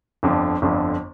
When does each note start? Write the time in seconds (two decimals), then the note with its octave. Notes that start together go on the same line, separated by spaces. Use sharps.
0.23 G1 F2 D3
0.62 G1 F2 D3